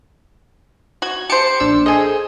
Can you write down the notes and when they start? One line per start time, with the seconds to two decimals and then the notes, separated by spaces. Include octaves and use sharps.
1.02 F#4 G#6
1.29 G4 C5 A5 C#7 D7
1.60 A#1 D4 E6
1.86 G#4 A4 C5 D#5 G#5